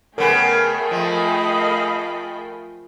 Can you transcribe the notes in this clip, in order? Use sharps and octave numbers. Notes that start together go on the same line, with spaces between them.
C#3 A3 B3 G#4 A#4 G5 G#5
F3 D#5 F5 B5